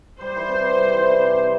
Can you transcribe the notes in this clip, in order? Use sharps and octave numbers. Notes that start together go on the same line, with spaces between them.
G3 C5
E3
C3
C3
G3
E3
C3
C3
G3